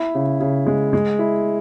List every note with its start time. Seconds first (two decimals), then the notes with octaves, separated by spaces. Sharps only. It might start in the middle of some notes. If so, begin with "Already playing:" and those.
Already playing: E4
0.15 C#3
0.41 C#3
0.67 G#3
0.93 G#3
1.19 E4